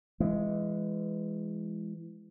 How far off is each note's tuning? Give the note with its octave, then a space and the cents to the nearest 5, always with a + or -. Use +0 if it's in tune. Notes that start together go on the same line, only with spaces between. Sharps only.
E3 +25 G#3 +0